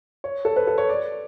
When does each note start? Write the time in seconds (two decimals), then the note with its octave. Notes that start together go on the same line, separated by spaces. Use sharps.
0.24 C#5
0.45 A4
0.56 B4
0.67 A4
0.78 C#5
0.89 D5